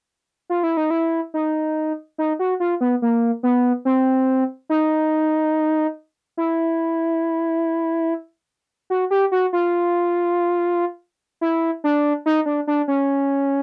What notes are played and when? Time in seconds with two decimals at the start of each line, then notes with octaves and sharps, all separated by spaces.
0.50 F4
0.63 E4
0.77 D#4
0.90 E4
1.34 D#4
2.18 D#4
2.39 F#4
2.60 F4
2.81 B3
3.02 A#3
3.43 B3
3.85 C4
4.69 D#4
6.37 E4
8.90 F#4
9.11 G4
9.32 F#4
9.53 F4
11.41 E4
11.84 D4
12.26 D#4
12.46 D4
12.67 D4
12.88 C#4